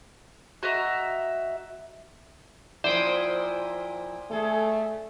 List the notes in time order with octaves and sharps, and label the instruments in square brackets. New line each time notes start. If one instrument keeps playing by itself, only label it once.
[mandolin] F#4 D#5 E5 A#5
[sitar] A#2 F3 E4 [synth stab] C5 G5 D#6 [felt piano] D5
[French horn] A3 [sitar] G#4 A4